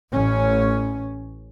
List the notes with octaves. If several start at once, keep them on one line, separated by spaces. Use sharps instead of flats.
A1 C#4